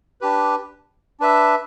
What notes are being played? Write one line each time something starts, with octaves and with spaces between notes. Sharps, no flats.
D4 G4 B4
D4 B4 E5